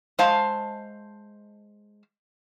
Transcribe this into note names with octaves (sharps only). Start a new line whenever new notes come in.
G#3 C5 F5 A5